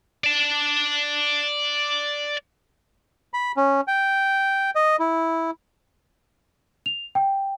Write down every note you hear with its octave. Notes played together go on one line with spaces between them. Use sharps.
D5 A5
B5
C#4
G5
D#5
E4
F7
G5